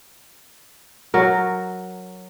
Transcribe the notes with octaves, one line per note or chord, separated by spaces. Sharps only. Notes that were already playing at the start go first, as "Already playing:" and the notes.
F#3 A#4